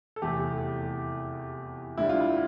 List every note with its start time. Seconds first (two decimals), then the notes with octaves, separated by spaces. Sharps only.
0.16 A4
0.22 F1 E2 E3 A3 G4
1.97 D2 D3 G3 E4
2.09 F4
2.20 E4